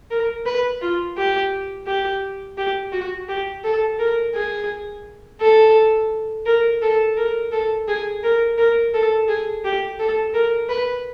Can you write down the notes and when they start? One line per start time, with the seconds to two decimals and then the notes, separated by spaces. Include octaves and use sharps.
0.11 A#4
0.46 B4
0.81 F4
1.17 G4
1.87 G4
2.58 G4
2.93 F#4
3.29 G4
3.64 A4
3.99 A#4
4.35 G#4
5.41 A4
6.46 A#4
6.82 A4
7.17 A#4
7.52 A4
7.88 G#4
8.23 A#4
8.58 A#4
8.94 A4
9.28 G#4
9.64 G4
9.99 A4
10.34 A#4
10.69 B4